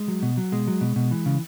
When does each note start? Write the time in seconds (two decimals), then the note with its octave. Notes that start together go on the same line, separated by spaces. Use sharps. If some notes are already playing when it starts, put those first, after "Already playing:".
Already playing: G#3
0.08 F#3
0.22 B2
0.37 F#3
0.52 B2 G#3
0.68 F#3
0.81 B2
0.96 B2
1.11 E3
1.26 C#3